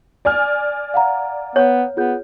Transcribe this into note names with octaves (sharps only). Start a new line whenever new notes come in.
D5 G#5 F6
F5 F#5 A#5
B3 C#5
B3 F4 G#4 G6